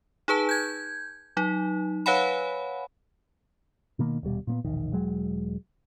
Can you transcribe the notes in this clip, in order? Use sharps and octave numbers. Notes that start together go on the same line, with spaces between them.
D#4 G#4 B4 A5
G6 G#6
F#3 D#4
B4 C#5 F5 F#5 G#5 B5
B2 D#3 A#3
D#1 B2 G3
A#2 A#3 B3
E1 A#1 D#3
E1 F#3 G#3